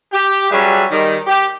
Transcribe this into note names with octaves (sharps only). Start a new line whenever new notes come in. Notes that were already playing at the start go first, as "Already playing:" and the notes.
G4
F#3 G3 C#4 G#4 B4 E5
D#3 G3
G4